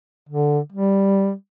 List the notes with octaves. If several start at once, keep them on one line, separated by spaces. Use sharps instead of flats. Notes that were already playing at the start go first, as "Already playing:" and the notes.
D3
G3